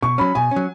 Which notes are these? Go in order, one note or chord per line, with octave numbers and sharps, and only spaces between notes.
B2 C#6
F#3 C#4 B5
B2 G#5
C#4
F#3